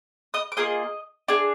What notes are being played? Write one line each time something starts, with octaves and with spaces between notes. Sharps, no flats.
D#5 D#6
D6
A#3 F4 G#4 D#5 D#6
D4 G#4